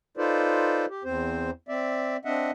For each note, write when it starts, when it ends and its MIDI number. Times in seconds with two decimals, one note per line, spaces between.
0.17 0.86 63
0.17 0.86 65
0.17 0.86 69
0.17 0.86 71
0.17 0.86 72
0.17 0.86 74
0.90 1.03 67
1.04 1.50 40
1.04 1.50 60
1.04 1.50 72
1.69 2.17 60
1.69 2.17 74
1.69 2.17 76
2.25 2.51 60
2.25 2.51 62
2.25 2.51 75
2.25 2.51 76
2.25 2.51 78